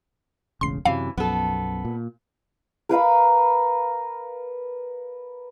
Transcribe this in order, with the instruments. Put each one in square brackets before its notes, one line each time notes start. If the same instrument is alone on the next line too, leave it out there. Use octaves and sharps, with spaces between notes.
[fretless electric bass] E1 A1 C#3 [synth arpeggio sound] C6 C7
[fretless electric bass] F#2 C3 F#3 [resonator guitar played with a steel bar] E3 [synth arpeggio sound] F5
[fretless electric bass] B1 F#2 F3 [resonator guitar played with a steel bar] B3 A4
[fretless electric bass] A#2
[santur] A#4 B4 F5 B5